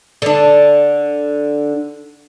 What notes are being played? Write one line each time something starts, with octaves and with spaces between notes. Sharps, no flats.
D3 D4